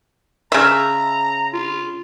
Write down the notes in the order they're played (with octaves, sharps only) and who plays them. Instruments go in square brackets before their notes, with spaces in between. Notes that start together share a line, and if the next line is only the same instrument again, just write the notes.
[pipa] C#3 E5 [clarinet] A#5
[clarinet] F4